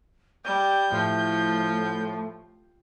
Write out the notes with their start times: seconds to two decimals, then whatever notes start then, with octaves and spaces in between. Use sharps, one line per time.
0.45 G3 G6
0.92 A2 F3